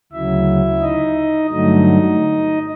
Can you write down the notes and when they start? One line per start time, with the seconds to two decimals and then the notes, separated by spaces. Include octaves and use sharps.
0.12 D2 C#3 F#3 E4 E5
0.81 D#4 D#5
1.50 G2 D3 F#3 A3 D#4 D#5